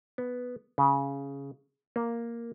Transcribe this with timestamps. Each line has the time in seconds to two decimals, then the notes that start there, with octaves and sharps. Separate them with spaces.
0.18 B3
0.78 C#3
1.96 A#3